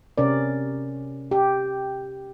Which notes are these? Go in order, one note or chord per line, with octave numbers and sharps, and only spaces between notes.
C3 C#4 A#4 D5
G4